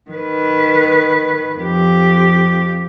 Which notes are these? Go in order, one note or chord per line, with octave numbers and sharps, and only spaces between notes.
D#3 B4
F2 G4